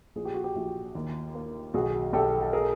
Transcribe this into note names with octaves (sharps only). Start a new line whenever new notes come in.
A#1 G#4
G4
F#4
G4
A#1
D#2
A#3
B1 F#4 G#4
B1 G4 A4
A4
G#4 A#4